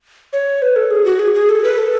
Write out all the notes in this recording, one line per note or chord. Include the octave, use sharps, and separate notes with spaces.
C#5
B4
A4
G#4
F#4
G#4
G#4
A4
B4
A4